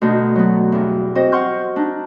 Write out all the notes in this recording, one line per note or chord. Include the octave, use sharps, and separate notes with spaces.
D2 B2 D#4
F#3 B3
E2 G2
C4 F#4 C5 D#5
F#5 C6 C#6 F6 G6
D4 D#4